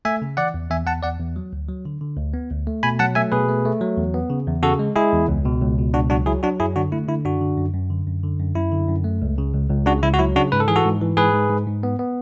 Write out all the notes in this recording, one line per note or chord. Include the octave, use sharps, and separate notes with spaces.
A3 E5 G#5
C#3
E3 D5 F#5
E2
E2 E5 G#5
E2 F#5 A5
E2 D5 F#5
E2
F#3
D2
F#3
D3
D3
D2
B3
D2
A3
B2 G#5 B5
F#3 F#5 A5
A3 E5 G#5
B2 G#4 B4
A3
A3
F#3
E2
B3
C#3
E2
C#3 F#4 A4
G#3
G#3 E4 G#4
E2
C#2
B2
C#2
B2
C#2 D4 F#4
F#3 D4 F#4
F#3 E4 G#4
F#3 D4 F#4
F#2 E4 G#4
D3 D4 F#4
A3 E4
D3 E4
F#2 D4 F#4
D3
F#2
F#2
D3
F#2
D3
F#2
F#2 E4
D3
F#2
A3
C#2
C#3
C#2
C#2
C#3 D4 F#4
C#2 E4
F#4
F#3 E4
C#3 D4 F#4
G#2 B4
A4
E3 G#4
F#4 A4
G#2
E3
G#2 G#4 B4
G#2
G#2
G#2
B3
B3